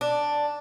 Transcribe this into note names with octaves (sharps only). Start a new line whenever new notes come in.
D4